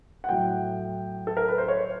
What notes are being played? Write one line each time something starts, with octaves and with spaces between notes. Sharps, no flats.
F#5
A2 F#3 G5
A4
A#4
B4
C5
C#5